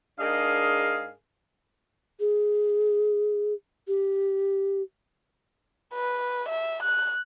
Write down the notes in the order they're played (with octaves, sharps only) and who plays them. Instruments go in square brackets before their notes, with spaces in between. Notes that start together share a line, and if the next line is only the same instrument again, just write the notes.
[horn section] G#2 D4 G#4 A#4 D#5 F5
[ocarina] G#4
G4
[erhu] B4
E5
F#6